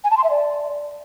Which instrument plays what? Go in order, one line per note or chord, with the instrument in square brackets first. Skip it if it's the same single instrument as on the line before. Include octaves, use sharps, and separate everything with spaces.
[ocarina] G#5
A5
C6
E5
D5